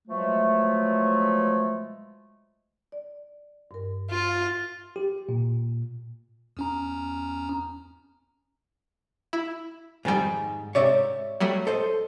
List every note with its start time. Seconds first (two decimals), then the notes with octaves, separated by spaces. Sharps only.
0.08 B2 F3 F#3 G#3 A3
2.92 D5
3.71 G2 A#4
4.11 F4
4.96 G4
5.29 A#2
6.57 E2 C#4 A#5
9.33 E4
10.05 F2 G#2 D#3 G3
10.75 G#2 C3 C#5 D5 E5
11.40 F#3 G3 A3
11.67 A4 C5 D#5